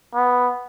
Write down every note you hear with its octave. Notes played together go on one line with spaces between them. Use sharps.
B3